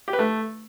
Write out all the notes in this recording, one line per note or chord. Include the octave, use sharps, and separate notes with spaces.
G4
B4
A3